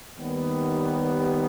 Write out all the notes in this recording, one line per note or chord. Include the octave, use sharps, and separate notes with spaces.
D#2 D#3 G3 B3